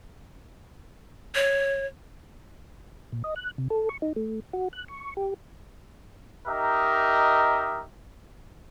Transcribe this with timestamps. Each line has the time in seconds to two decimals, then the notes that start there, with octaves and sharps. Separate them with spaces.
1.35 C#5
3.12 A#2
3.24 D#5
3.36 F#6
3.58 C3
3.70 A4
3.89 C#6
4.02 D#4
4.16 A3
4.53 F#4
4.73 F#6
4.88 C#6
5.17 G4
6.47 D#4 G4 A#4 D#5 E5